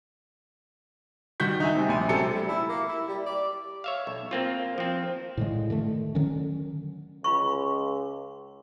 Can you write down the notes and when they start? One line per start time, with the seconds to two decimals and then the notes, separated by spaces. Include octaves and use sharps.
1.40 D#3 G3 F#4 G6 B6
1.60 D#4 E5 G#5
1.75 C3 G3
1.89 A#1 G#5
2.09 C3 F#3 A4 C#7
2.35 G3
2.49 E4
2.69 A#3
2.88 E4
3.08 G3
3.26 D5
3.84 C#5 E5 F5
4.07 B1
4.31 A#3 C4 F4
4.78 F3 C4
5.37 A2 D3 G#3
5.70 D3 D#3 A3
6.15 D3 D#3 F#3 C#4
7.24 C#2 F4 B5 C#6